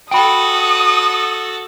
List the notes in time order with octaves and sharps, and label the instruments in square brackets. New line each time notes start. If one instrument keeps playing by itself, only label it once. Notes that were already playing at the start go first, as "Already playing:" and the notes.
[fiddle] F#4 A4 [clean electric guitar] G5 B5 [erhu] D#6